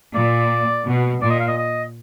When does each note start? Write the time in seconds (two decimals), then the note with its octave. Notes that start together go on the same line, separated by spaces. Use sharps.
0.14 A#2 D5
0.86 B2
1.21 A#2 D5
1.30 D#5
1.40 F5
1.48 D#5
1.58 D#5